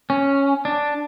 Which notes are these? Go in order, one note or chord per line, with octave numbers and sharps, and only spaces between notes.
C#4
D4